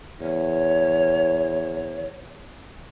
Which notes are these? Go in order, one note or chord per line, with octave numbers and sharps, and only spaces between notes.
E2 C#5